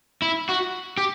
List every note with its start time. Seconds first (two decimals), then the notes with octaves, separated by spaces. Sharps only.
0.22 E4
0.49 F#4
0.97 G4